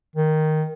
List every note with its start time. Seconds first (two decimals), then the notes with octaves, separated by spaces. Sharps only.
0.16 D#3